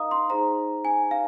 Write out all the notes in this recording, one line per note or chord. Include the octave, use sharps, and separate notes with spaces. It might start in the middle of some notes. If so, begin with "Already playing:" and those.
Already playing: D#4 A#4 D#5 F5 A#5 D#6
C6
D#4 G#4 C5 A#5
G#5
F5